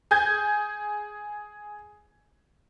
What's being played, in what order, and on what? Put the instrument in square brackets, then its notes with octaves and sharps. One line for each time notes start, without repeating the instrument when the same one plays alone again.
[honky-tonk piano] G#4 G6 G#6